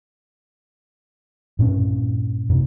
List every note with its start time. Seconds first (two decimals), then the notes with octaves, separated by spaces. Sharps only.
1.59 G2 A#2 C4 C#4
2.50 F#2 C3